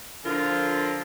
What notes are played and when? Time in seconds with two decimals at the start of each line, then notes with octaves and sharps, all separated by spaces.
0.25 D3 F3 F4 A#4